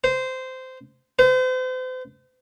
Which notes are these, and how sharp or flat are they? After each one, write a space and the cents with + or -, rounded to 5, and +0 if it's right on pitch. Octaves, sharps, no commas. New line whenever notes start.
C5 -15
C5 -40